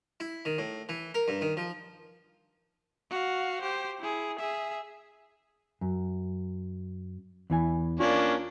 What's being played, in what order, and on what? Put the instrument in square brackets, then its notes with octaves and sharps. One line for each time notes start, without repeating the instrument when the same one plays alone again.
[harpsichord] E4
D#3
A2
E3
A#4
G2
D#3
F3
[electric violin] F#4 F5
G4 C5
E4 G#4
G#4 E5
[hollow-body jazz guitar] F#2
E2 E3 G#5
[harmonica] A#3 C#4 D4 [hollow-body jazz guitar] F4